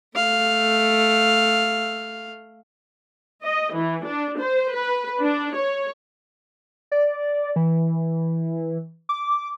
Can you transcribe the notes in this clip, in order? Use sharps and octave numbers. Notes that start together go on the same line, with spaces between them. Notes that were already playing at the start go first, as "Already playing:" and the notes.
A3 F5
D#5
E3
D4
C5
B4
D4
C#5
D5
E3
D6